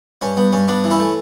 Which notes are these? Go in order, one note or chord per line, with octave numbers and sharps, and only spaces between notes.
G2 C#4
G2 B3
G2 C#4
G2 B3 D4
E3
C#4 E4
A3